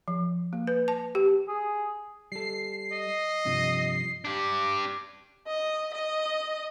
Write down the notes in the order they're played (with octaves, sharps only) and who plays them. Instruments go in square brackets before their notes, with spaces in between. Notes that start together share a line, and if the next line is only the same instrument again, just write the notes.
[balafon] F3
A#3
B4
A5
G4
[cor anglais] G#4
[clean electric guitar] G3 A4 [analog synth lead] C7
[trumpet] D#5
[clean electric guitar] G2 C3 F3
[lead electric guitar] D4 G4
[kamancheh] D#5
D#5